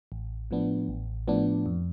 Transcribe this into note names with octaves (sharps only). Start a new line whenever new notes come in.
A1
A2 F3 B3 D4
A1
A2 F3 B3 D4
F2